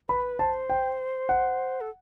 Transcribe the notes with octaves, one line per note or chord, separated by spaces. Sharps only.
B4 B5
C5 A5
G5
F#5
A4